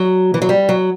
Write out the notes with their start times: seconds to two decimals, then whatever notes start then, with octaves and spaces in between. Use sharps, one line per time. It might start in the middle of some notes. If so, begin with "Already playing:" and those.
Already playing: F#3
0.34 E3
0.42 F#3
0.49 G3
0.69 F#3